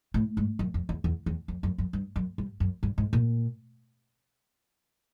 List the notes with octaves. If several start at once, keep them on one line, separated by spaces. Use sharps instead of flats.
A2
G#2
F#2
F2
E2
E2
E2
F2
F#2
F#2
G2
F#2
G2
F#2
G2
G#2
A#2